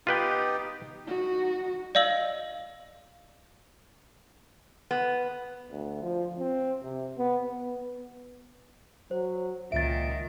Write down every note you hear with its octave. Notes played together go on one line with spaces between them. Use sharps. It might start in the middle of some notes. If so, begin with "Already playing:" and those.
B3 D#4 F4 G4 B4 G5
D#4 F#4
D5 D#5 F5 E6 F#7
B3
D2
F3
C4
C3
B3
B3
F#3 C5
C#2 A#2 D#3 E5 A6 D7